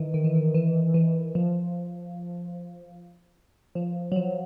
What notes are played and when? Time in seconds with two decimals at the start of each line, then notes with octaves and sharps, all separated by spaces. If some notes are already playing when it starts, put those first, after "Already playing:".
Already playing: D#3 E3
0.14 D#3
0.24 E3
0.35 D#3
0.54 E3
0.94 E3
1.35 F3
3.75 F3
4.12 F#3
4.16 F3